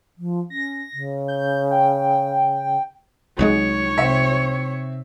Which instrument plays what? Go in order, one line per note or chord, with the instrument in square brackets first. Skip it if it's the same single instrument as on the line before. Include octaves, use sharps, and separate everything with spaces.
[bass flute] F3
[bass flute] C#4 [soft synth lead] A#6
[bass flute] C#3
[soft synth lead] G6
G5
[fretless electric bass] C2 F#3 G#3 [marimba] D#4 [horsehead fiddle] C#5
[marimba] C3 [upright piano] C4 E5